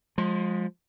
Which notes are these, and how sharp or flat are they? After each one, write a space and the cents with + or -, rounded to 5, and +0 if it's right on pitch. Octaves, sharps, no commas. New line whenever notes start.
F3 +25 G#3 -5